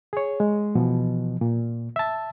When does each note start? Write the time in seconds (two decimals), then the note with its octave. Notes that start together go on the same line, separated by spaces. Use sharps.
0.13 G#4 C#5
0.40 G#3
0.75 B2 E3 F3
1.41 A#2
1.96 E5 A5